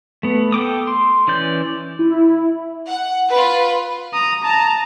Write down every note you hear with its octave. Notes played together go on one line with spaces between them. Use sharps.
A3 B3
A4 G5 D6 D#6
C6
E3 C#4 D5 G6
E4
F#5
F4 B4
A#5 D#6
A5 A#5